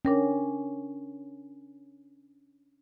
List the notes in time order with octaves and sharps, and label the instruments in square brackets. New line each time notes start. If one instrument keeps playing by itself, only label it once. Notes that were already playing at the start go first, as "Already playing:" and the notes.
[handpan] C#4 [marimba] D4 A#4 G5